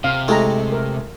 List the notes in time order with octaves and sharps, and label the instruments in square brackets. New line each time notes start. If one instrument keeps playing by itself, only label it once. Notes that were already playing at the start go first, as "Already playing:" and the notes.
[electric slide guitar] C3 [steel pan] F5
[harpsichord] G#3 A3 [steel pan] E4 G4 A#5
[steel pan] A#4